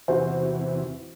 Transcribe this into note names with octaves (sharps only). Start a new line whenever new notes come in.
E2 C3 E3 F#4 C5